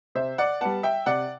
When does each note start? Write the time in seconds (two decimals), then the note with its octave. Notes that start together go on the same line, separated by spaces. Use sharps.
0.15 C3 C5 E5
0.38 D5 F#5
0.61 G3 B3 F#5 A5
0.83 E5 G5
1.06 C3 D5 F#5